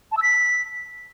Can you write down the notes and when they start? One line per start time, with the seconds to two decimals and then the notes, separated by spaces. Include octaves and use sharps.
0.12 A5
0.17 E6
0.22 B6